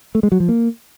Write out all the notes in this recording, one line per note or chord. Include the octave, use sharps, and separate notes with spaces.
A3
G#3
F#3
F3
A#3